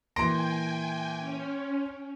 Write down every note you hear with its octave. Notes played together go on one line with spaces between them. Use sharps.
A#2 E3 G5 G#5 C6 A#6 D7
C#4